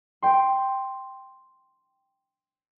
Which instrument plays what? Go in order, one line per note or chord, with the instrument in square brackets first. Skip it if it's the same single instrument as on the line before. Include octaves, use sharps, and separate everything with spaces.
[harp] G5 C6